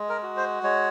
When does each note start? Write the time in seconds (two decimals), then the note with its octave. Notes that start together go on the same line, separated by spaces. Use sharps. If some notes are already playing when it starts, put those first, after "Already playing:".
Already playing: G#3
0.09 A#4
0.23 F#4
0.37 C5
0.63 G#3 C#5